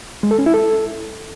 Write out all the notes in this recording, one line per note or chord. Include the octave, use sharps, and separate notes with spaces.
G#3
A4
C#4
E4
A4